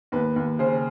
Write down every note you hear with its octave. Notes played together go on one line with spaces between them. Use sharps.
D#2 B4
D#2
C#3 C5